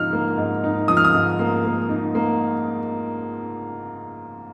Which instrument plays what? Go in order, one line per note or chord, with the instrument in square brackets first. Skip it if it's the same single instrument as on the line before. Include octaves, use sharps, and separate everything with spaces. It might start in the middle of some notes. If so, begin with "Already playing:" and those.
Already playing: [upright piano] G#2 F3 D#4 [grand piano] F6
[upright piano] A#3
G#2
D#4
[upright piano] F3 [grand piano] D#6
[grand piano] F6
D#6
[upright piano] G#2
A#3
A#3
D#4
A#3